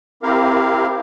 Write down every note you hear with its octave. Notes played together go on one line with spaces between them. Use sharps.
C4 E4 G4 A#4 F5